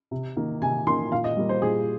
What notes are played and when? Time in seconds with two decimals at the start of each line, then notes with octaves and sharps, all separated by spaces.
0.11 C3
0.37 D#3 A#3
0.62 C3 G#5
0.87 D#3 A#3 C6
1.12 A#2 F5
1.24 D#5
1.37 G3 A#3
1.49 C5
1.62 A#2 G#4